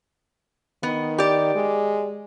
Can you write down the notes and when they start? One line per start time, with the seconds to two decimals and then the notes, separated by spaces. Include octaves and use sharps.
0.83 D#3 B3
1.18 G4 D5
1.55 G#3